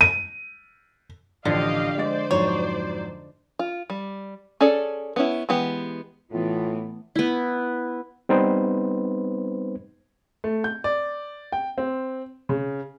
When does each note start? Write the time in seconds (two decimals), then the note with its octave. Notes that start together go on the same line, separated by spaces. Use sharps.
0.01 D#7
1.45 A1 D3 F3 G4 D#5 F5
1.98 G#3 C5 D5 D#5 A6
2.31 F2 G#2 F#3 C#5
3.59 F4
3.90 G3
4.61 C#4 G#4 A4 D5
5.16 B3 C#4 E4
5.49 E3 G#3 B3 G4
6.32 A2 E3 A3 B3 F4
7.16 B3 E4
8.29 G3 B3 C4 D#4 B4 C5
10.44 A3
10.64 G6
10.84 D5
11.52 G5
11.78 C4
12.49 C#3